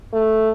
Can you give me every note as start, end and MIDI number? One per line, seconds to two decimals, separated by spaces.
0.13 0.50 57